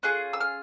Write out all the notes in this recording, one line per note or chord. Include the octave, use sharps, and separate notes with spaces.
C#4 F4 G#4 F#6
E6
F6